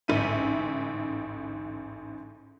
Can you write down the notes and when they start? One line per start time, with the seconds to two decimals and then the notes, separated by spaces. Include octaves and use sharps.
0.08 A1 D2 G#2 E5 D#7